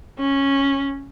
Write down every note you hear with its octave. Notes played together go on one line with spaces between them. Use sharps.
C#4